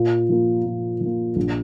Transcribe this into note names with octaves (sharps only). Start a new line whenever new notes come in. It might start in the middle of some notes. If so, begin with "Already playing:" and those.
Already playing: A#2
F3 A#3
A#2
F3 A#3
A#1